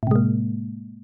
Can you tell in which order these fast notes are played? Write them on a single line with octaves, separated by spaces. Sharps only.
A2 C3 G#3 A#3